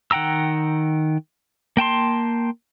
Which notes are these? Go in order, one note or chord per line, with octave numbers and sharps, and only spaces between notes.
D#3 F#5 G5 A#5 E6
A#3 G5 A5 C6